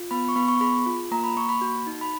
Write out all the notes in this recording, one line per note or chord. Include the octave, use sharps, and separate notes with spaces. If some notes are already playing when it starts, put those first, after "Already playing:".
Already playing: F4
B3 B5
C#6
B3 B5
C#6
G#4 B5
F4
A#3 A#5
B5
A#3 C#6
B5
F#4
D#4
B5